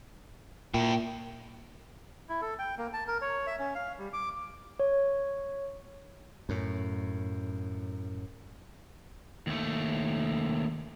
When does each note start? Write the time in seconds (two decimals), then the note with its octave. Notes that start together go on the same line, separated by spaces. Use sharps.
0.74 A#2 E4 G5
2.29 E4
2.42 A4
2.59 G5
2.78 A#3
2.93 A5
3.08 A#4
3.21 C#5
3.47 E5
3.59 C#4
3.75 F5
3.99 G3
4.13 D6
4.80 C#5
6.49 F#2 A2
9.47 D#2 A3